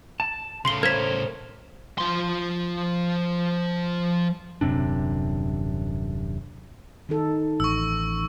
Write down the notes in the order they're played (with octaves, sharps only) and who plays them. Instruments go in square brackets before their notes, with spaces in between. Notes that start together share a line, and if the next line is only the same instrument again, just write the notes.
[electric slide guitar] A5
[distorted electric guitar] A2 C#3 [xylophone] C6 C7 G7
[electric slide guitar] A#4 C5 C#5 [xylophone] G#6 B6
[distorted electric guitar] F3 C6
[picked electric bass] D#1 F#2 C3 D4
[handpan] D#3 D#4 A4
[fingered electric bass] A1 [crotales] C#6 E6